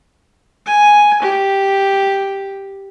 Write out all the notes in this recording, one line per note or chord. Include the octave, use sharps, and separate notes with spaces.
G#5
G4